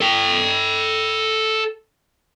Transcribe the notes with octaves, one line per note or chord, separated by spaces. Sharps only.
A4 G5